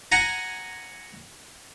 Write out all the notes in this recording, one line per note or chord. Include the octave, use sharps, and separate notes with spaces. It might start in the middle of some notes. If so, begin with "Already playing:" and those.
F#5 G#5 A#5